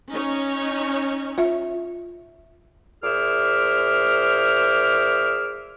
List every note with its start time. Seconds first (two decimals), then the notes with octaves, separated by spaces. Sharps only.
0.10 C#4 D#4 C#5
1.38 F4 E5
3.03 A#2 G#4 C5 E5 D6 F6